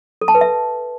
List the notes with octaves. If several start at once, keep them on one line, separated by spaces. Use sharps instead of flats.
A4
A5
B4
E5